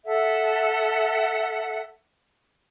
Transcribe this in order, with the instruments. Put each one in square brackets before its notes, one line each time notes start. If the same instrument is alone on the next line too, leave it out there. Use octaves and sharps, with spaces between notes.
[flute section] A4 E5 F#5